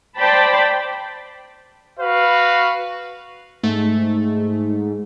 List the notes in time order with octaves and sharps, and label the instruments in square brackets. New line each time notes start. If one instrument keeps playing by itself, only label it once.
[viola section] C5 D5 G5 A5 B5
[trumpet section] F#4 B4 F5
[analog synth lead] G#2 [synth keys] A3